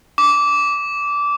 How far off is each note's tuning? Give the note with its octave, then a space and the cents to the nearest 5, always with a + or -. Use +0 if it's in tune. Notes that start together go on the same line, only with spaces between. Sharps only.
D6 -20